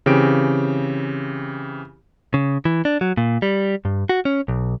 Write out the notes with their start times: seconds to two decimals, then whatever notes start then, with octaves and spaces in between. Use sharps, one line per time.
0.06 C#3 E3 C4 G4 D7
2.34 C#3
2.65 E3
2.85 D4
3.01 F#3
3.17 A#2
3.42 G3
3.85 G2
4.09 F#4
4.25 C#4
4.48 B1